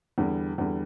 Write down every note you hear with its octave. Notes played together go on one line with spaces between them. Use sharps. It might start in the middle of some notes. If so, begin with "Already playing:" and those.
E2 D3 G3
E2 D3 G3